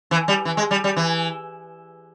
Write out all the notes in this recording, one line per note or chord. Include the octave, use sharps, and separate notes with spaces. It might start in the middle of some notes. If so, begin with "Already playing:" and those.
E3
G3
E3
G#3
G3
G3
E3